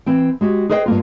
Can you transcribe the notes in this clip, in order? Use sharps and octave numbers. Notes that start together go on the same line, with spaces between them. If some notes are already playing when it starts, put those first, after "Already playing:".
E3 C4 G5
G#3 F#4 G4
G#4 B4 C5 D#5 E5 G5
G2 A#3 F4